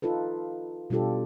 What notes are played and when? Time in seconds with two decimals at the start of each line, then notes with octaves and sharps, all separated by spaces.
0.02 D#4 F4 A4 B4
0.90 B2 G3 D4 F4 G4 A4